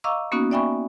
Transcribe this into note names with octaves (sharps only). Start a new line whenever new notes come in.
D#5 F5 A#5 C#6 D6 E6
A#3 B3 C#4 D#4 F#4
D5 E5 G5 G#5 B5 C#6